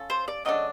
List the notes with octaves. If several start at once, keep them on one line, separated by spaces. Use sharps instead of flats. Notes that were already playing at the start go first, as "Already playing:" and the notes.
Already playing: C#4 F4 A4
C5
D5
C#3 F#3 A3 D4 D#5